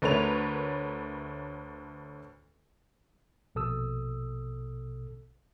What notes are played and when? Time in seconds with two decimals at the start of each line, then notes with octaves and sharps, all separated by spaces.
0.02 D2 A3 A#4 B4 C#5 F7
3.55 A#1 B2 A4 D#6 E6